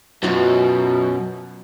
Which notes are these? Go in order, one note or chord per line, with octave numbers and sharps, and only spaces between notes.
F#2 B2 F#3 F4 F#4